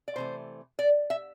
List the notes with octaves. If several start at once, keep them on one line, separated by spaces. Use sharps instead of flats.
D5
C3 E3 A3 C5
D5
E5